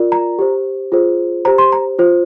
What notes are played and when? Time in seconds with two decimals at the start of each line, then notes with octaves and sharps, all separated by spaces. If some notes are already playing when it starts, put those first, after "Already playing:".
Already playing: F4 A#4 D5
0.12 A#5
0.39 G4 C5
0.92 F4 G#4 C5
1.45 G4 C5 A#5
1.58 C6
1.72 A#5
1.99 F4 C5